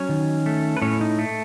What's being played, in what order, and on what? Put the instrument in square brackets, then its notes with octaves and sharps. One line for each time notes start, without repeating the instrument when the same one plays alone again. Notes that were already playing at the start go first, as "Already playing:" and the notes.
Already playing: [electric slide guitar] F#3 C#4 C#5
D#3
A3
B4
A2 C#4 C#5
D#4
A3